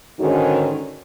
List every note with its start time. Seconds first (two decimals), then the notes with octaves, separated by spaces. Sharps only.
0.20 G#2 D3 D#3 C#4 F#4